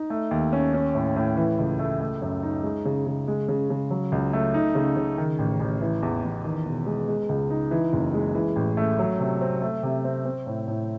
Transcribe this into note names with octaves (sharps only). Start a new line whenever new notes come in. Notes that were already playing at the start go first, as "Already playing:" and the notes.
Already playing: D#4
A3
D#2
C#4
C#4
A2
A2
E3
C#2
A3
A3
F#2
D#4
G#3
C#3
C#3
G#3
C#3
C#3
F#3
C#2
A3
D#4
C#3
C#3
D#3
A1
A1
E3
E2
E2
D#3
E1
G#3
G#3
C#2
D#4
E3
F#1
G#3
E3
A1
A3
F#3
C3
C4
A3
C3
C4
C4
A2
A2